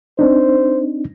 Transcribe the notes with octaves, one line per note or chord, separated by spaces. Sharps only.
C4 D4 D#4 C5